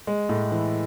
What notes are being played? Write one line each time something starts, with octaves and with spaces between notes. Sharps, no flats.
G#3
A2
E3